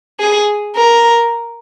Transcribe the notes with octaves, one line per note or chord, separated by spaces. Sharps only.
G#4
A#4